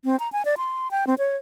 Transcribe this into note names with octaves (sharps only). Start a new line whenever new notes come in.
C4
A#5
G#5
D5
C6
G5
C4
C#5